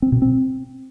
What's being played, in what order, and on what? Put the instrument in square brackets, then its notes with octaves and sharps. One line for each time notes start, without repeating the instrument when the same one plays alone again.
[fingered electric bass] C4
B2
C4